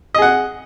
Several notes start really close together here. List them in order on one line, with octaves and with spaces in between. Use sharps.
D#5 G#4 F#5